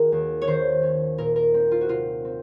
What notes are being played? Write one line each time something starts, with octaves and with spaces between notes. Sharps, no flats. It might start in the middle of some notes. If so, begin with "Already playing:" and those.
Already playing: D#3 F#4 G#4 A#4
D#2
C#5
D#3 C5
C#4
A#2 A#4
A#4
C4
F4
F#4
C3 F4
C4